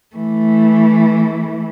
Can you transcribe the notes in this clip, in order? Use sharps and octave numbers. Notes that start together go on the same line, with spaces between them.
E3 A3